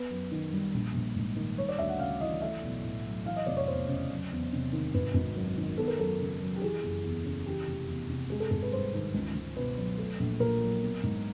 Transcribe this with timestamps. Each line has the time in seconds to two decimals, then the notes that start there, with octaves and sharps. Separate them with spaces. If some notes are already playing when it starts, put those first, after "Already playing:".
Already playing: B3 B4
0.10 F#2
0.31 D#3
0.53 G3
0.74 A#1
0.94 A#1
1.16 G#2
1.36 D#3
1.58 G3 C#5
1.68 D5
1.79 D2 E5
1.89 F#5
1.99 C#3 F5
2.21 E3 D#5
2.42 A3 E5
2.63 B1
2.83 A2
3.05 F#3
3.25 E3 F5
3.36 D#5
3.46 F1 D5
3.57 C#5
3.68 E2 C5
3.88 C#3
4.10 F#3
4.31 E2
4.52 C3
4.73 D#3
4.94 G#1 B4
5.14 G#1
5.35 F#2
5.57 D#3
5.77 B3 A4
5.88 A#4
5.99 F#2 A4
6.20 C#3
6.41 F#3
6.56 G4
6.61 E3 G#4
6.84 F#1
7.04 E2
7.25 C#3
7.46 E3 G4
7.67 F1
7.89 E2
8.09 C3
8.30 G#3 G#4
8.40 A4
8.51 G#1 A4
8.62 B4
8.72 G2 C5
8.94 D#3
9.14 C#2
9.35 C#2
9.56 B2 B4
9.77 F#3
9.98 A3
10.20 A#1
10.40 A#2 A#4
10.61 F#3
10.82 B3
11.03 G#2